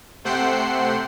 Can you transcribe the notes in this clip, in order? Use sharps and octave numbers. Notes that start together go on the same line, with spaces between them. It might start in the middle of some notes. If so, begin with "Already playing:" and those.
C3 A3 C5 F#5 G5 C7